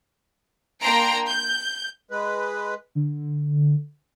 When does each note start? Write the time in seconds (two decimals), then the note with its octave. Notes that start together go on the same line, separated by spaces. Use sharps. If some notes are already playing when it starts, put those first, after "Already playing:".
0.82 A#3 D4 G5 A#5 C6 D7
1.28 G6
2.11 G#3 B4
2.95 D3